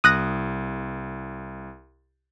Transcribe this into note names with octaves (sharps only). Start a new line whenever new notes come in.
C2 D#6 F#6 A#6